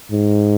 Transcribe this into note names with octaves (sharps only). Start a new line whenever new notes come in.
G#2